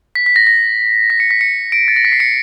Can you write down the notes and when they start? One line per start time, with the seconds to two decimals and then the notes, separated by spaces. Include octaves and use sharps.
0.15 B6
0.26 B6
0.36 A#6
0.47 A#6
1.10 B6
1.20 C#7
1.31 B6
1.41 C#7
1.72 D7
1.88 A6
1.96 A#6
2.05 B6
2.12 C7
2.20 C#7